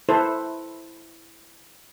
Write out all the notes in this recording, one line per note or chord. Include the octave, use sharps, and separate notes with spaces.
E4 A4 B4 C5